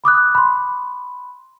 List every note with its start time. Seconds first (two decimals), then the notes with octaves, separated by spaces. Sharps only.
0.04 B5 D6 D#6 F#6
0.35 B5 C6